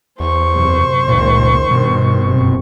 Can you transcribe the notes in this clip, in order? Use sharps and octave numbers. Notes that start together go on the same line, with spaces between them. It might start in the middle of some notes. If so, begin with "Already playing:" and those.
E2 C5 C#6
F#2 C3
F1 C#2 A#2 D#3
G2 B2 D#3
F#1 C3 C4